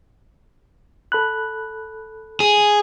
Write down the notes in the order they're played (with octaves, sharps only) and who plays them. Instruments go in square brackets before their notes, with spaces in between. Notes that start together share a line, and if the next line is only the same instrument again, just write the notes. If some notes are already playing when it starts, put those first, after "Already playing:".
[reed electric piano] A4 B5 F#6
[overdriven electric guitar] G#4